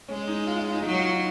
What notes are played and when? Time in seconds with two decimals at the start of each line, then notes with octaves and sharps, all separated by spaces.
0.09 G#3 C#4
0.28 D#4
0.47 F4
0.60 F4
0.73 D#4
0.85 F#3 D#4
0.99 F4
1.11 D#4